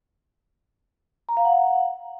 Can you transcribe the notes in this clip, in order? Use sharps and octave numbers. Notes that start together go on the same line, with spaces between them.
A#5
F5
F#5